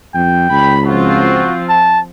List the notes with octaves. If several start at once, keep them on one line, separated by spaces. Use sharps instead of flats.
F2 G5
C#2 B5
F3 C4 F4 F#4
A5